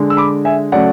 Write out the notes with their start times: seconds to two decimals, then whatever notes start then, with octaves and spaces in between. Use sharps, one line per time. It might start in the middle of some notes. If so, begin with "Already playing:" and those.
Already playing: D3 G#3
0.10 E6
0.17 B5 D6
0.45 E5 G#5
0.72 C#3 F#3 A3 D5 F#5